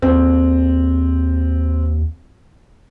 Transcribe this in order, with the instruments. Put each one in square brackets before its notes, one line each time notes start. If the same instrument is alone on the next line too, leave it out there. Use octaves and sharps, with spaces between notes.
[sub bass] D#2 [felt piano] C4